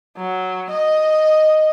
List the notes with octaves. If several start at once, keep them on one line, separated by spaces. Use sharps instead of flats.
F#3
D#5